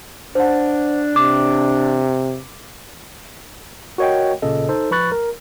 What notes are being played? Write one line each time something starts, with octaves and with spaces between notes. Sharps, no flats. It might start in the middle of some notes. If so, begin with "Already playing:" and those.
D4 C5 F#5
C3 D6
F#4 A#4 C#5 D#5 F#5 G5
A1 A#2 C#3 A4 D#5
D#4 A4 C5
F3 B4 B5 C#6 F#6 A6
A#4